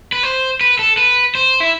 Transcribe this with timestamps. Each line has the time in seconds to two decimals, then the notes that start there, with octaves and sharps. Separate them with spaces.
0.12 B4
0.23 C5
0.61 B4
0.79 A4
0.97 B4
1.35 C5
1.60 E4